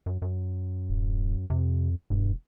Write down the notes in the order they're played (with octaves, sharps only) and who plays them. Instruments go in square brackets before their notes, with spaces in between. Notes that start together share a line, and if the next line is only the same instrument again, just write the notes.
[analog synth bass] F#2
F#2
[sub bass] D1
[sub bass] F2 [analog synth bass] C3
[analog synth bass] E1 [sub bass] G2